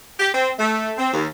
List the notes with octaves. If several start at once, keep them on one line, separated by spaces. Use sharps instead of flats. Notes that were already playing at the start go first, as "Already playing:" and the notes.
G4
C4
A3
C4
D#2